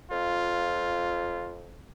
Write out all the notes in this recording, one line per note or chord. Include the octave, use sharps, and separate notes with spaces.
F2 F4